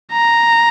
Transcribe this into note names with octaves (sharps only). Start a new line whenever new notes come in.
A#5